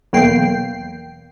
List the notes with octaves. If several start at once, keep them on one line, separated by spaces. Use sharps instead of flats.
B1 E2 A#3 G5 C7